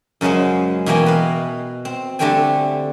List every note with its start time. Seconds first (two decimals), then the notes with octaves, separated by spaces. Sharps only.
0.21 F#2 C#3 F#3 G#3 C5
0.86 B2 E3 A#3 G5 G#5 A#5
1.06 B4 F5
1.85 C4
2.19 D3 G3 A3 C4 G5 G#5